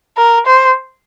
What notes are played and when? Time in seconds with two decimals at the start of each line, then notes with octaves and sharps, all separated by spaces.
0.18 A#4
0.47 C5